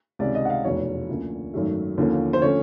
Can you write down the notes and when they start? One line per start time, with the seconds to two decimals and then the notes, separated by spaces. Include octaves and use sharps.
0.19 C#2 C3 D#3 D5
0.35 D#5
0.45 F#5
0.50 F5
0.64 F1 E2 B2 C#5
1.09 D2 D3 F3 A#3 C#4
1.53 G#1 F#2 D#3 F#3 A3
1.97 D#2 D3 F3 A#3 C#4
2.33 C5
2.42 D3 F3 A3 C#4 C#5